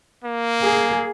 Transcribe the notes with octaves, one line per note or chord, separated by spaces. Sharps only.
A#3
G#4